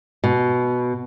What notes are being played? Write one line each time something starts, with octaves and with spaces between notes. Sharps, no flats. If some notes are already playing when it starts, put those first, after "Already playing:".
B2